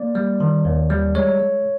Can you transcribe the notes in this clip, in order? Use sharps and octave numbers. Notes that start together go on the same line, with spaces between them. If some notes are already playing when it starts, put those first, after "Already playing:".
Already playing: A#3 D5
G3
D#3
D#2
G3
G#3 C#5
G#3